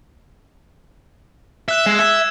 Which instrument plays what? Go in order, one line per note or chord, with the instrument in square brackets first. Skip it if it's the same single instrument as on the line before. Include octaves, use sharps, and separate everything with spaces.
[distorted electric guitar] E5 [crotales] E6 F#6 E7
[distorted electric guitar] G#3
[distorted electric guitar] E5 [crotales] E6 G#6